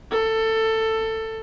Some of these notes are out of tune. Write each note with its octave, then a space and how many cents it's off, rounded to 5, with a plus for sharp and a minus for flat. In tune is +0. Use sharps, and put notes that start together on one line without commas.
A4 +15